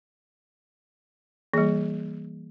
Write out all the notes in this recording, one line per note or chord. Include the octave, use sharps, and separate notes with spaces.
E3 G3 A#3 G#4